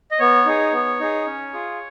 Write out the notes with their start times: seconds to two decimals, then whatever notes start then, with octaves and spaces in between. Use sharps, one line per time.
0.11 D#5
0.19 B3 C#5
0.46 D#4 G#4
0.73 B3
1.00 D#4 G#4
1.26 C#4
1.53 F4 G#4